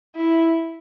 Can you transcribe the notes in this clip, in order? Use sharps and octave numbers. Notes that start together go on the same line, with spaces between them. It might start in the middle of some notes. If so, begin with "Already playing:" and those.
E4